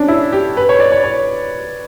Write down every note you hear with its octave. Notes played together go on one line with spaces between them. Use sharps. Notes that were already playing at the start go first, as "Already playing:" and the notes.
Already playing: C#4 D4
E4
G4
B4
C#5
D5
C#5
C#5